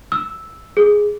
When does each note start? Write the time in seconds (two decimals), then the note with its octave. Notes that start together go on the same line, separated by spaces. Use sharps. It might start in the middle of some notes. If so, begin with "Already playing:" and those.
0.12 E6
0.77 G#4